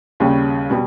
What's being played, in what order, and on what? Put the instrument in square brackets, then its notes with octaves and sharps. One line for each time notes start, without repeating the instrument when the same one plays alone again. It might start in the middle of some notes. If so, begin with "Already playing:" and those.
[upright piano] D#2 C#3 G3 C#4
B2 G3